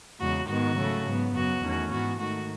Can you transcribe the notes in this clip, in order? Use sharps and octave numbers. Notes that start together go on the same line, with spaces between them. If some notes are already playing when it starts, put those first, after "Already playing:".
E2 C#3 G#3 F#4
G#2 D#3 G#3 B3 F#4
C#3 F#3 A3
G#2 F#3 B3
F#2 C#3 F#3 B3 F#4
E2 D#3 A3 C#4
G#2 E3 B3 F#4
G#2 D#3 A3 F#4